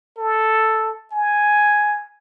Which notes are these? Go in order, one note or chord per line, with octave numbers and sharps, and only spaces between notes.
A4
G#5